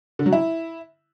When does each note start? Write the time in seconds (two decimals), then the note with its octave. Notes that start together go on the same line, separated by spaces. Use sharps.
0.19 D3
0.26 F#3
0.33 E4